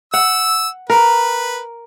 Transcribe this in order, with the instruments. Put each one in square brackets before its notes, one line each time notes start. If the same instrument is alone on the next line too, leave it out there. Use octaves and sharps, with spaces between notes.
[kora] F#5 [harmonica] E6
[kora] A#4 [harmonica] B4